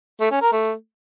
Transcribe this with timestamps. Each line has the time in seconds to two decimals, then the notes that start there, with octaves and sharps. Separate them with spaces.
0.20 A3
0.31 C#4
0.42 A#4
0.52 A3